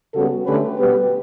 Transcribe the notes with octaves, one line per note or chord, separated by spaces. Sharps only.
C#3 G3 B3 F#4 A4
D3 A3 C#4 G4 B4
B2 G3 B3 G4 B4